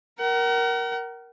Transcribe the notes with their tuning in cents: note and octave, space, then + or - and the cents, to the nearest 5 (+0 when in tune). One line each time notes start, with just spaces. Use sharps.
A#4 +10 F#5 +40